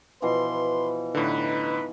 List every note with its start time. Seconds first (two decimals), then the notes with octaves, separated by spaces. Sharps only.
0.22 B2 E3 F3 B4 C6
1.15 A2 D3 D#4 B4